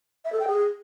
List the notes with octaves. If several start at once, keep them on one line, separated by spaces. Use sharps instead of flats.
E5
A4
G5
G#4